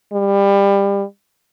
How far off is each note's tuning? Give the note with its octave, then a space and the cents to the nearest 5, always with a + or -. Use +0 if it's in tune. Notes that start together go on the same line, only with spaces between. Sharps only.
G3 +20